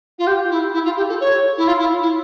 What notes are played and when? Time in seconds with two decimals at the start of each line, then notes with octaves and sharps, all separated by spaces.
0.18 F4
0.27 G4
0.50 E4
0.74 E4
0.85 F4
0.96 G4
1.09 A4
1.20 C#5
1.57 E4
1.67 F4
1.79 E4
2.02 E4